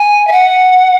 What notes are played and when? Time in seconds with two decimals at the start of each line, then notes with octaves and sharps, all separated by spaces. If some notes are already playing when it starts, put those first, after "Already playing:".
Already playing: G#5
0.27 E5
0.32 F#5